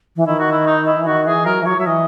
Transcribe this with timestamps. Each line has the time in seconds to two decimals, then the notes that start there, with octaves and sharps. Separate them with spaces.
0.16 E3
0.27 D#3 E4
0.39 F#4
0.51 E4
0.67 D#4
0.86 E4
0.96 E3
1.06 D#3 F#4
1.26 E3 G#4
1.45 F#3 A#4
1.62 E3
1.65 F#3 C#5
1.78 F#3 E5
1.86 E3 D#5